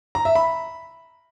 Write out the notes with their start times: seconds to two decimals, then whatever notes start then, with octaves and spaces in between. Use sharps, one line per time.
0.15 A#5
0.25 E5
0.35 B5